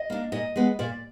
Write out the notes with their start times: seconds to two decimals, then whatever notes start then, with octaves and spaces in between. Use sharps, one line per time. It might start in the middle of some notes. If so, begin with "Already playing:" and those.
Already playing: D#5
0.10 A#3 D4
0.32 A#2 D#5
0.56 G#3 B3
0.79 A#2 D5